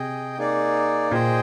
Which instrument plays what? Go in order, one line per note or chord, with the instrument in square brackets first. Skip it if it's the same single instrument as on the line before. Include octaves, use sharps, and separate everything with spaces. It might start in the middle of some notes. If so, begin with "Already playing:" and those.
Already playing: [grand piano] C3 [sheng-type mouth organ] G#4 D#5 G5
[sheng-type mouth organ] A#3 D#4 G#4 D5
[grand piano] A#2 [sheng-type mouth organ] G#4 C5 D#5 G5